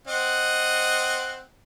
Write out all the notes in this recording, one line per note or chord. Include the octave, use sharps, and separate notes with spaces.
C4 D#5 F#5